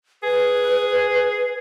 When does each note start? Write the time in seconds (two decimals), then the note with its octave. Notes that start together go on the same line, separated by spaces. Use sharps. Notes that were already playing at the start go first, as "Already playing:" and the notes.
0.23 G#4 B4